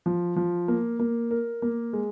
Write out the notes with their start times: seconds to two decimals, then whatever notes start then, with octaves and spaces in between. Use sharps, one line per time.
0.06 F3
0.36 F3
0.68 A#3
1.00 A#3
1.31 A#4
1.62 A#3
1.93 G#3